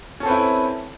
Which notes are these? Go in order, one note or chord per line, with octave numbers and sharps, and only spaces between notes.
C4 C#4 E4 A4 B4